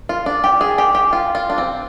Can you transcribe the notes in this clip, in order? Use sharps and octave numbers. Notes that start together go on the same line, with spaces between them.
F4
D4
G4
G#4
G4
G4
F4
F4
D4
C4